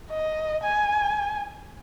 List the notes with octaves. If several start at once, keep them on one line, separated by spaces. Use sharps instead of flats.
D#5
G#5